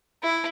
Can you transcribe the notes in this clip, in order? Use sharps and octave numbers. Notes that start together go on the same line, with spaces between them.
E4